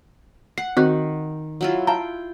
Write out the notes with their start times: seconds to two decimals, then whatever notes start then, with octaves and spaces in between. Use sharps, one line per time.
0.58 F#5 C7
0.77 D#3 C4 F#4 F#6
1.61 F#3 E4 F4
1.87 F5 G5 A5 A#5